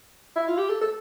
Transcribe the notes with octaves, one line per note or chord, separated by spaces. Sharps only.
E4
F4
G4
A4
A4